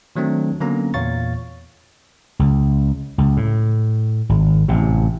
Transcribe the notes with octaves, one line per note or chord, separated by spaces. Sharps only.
D#3 F#3 A3 C4 D4
D3 F#3 A#3 B3 C#4 A#5
E2 A#2 C#5 F5 C#6 A6
C#2
C#2
A2
G#1
A1 C3